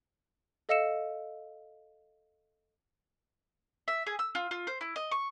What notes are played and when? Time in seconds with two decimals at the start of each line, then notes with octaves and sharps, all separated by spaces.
0.69 A4 D#5 F5 E6 C#7 E7
3.88 E5
4.07 G#4
4.19 E6
4.35 F4
4.51 F4
4.67 C5
4.81 E4
4.96 D#5
5.12 C#6